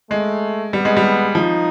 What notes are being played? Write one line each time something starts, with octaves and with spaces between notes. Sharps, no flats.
G#3 A3
G3 B3
G#3
G3
F3 D#4